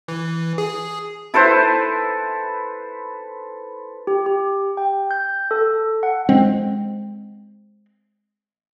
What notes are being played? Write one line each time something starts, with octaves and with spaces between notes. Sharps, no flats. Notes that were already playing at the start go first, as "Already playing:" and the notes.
E3
G#4
E4 A4 B4 C5
G4
G4
G5
G6
A4
F#5
G#3 C4